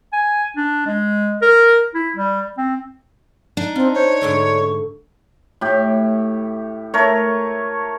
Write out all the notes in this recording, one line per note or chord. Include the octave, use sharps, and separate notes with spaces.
G#5
D4
G#3
A#4
E4
G3
C4
D4 D#4
C4 F4
C5 C#5
G#2 D3 A3 C#6
A2 G4
A3 A#4 C#5